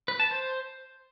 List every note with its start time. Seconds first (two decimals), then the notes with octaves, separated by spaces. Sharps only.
0.08 B4
0.20 A5
0.31 C5